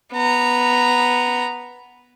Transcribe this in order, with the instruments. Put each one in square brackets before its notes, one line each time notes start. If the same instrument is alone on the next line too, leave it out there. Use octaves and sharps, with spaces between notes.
[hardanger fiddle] B3 A#5